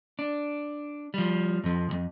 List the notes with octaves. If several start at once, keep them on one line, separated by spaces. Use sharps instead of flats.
D4
F3 G3
F2 F3
B1 F2